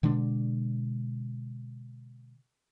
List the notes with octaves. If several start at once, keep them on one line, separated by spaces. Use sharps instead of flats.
B2 D3 G#3 D4